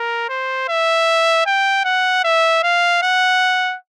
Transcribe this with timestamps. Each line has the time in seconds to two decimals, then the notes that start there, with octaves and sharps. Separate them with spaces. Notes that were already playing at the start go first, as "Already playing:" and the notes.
Already playing: A#4
0.29 C5
0.68 E5
1.46 G5
1.84 F#5
2.24 E5
2.63 F5
3.02 F#5